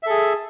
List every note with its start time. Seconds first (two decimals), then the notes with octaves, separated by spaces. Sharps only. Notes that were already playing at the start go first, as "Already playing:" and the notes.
0.03 E5
0.06 A4
0.10 G#4